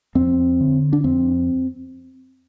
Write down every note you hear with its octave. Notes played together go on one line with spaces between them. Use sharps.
F2 C4
D3
D4
F2 C4